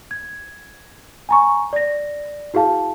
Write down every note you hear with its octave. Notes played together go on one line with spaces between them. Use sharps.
G#6
G#5 A#5 C#6
D5 A#6
E4 F#4 G#4 F5 A5